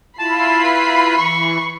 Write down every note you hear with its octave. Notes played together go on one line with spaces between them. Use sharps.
E4 F4 A5 B5 C7
B4
E3 C#6